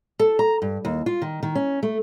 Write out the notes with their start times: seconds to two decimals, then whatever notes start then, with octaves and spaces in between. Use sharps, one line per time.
0.19 A4
0.39 A#5
0.62 G2
0.85 D#2
1.06 F4
1.22 D#3
1.43 D#3
1.55 C#4
1.83 A3